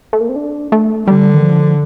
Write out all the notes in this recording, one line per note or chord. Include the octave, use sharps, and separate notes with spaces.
A3
A#3
C4
D4
A3
D3 G3
D#3
F3